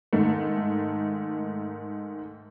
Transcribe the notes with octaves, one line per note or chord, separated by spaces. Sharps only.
G#2 D#3 A3